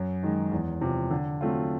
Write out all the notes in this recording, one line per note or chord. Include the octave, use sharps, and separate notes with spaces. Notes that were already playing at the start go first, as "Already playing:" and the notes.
Already playing: F#2
D#3 G#3
E2
C3 F3
D3
F#3 A3 C4 F4